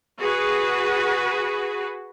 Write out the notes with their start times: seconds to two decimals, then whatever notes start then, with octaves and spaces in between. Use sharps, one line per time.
0.19 F#4 G#4 B4